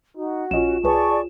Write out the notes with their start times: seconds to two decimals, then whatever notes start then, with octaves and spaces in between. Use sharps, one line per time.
0.17 D#4 F#4
0.51 A#1 C#4 F4 D#5 E7
0.84 C2 G#4 B4 C#5 D5 A5 C#6